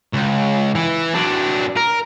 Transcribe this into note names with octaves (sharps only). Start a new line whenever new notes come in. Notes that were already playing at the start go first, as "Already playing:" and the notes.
C#2
E3
F#3 D4
A#4